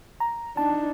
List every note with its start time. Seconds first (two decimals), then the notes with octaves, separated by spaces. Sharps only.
0.20 A#5
0.57 D4 D#4 A5